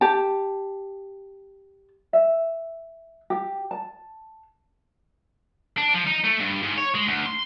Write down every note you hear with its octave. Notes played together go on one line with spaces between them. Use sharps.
G4 A5
E5
G4
A5
D4
F3
D#4
A3
G2
G#2
C#5
G#3
D2
C6